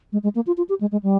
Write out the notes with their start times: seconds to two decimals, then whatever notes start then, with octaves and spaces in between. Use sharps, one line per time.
0.12 G#3
0.23 G#3
0.35 A#3
0.47 F4
0.57 F4
0.69 G4
0.81 G#3
0.92 G#3
1.03 G3